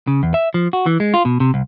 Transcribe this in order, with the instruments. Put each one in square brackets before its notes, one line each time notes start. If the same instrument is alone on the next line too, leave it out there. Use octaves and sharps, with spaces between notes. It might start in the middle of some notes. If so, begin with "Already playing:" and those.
[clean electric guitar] C#3
E2
E5
F3
F#4
E3
G#3
F4
B2
C3
C2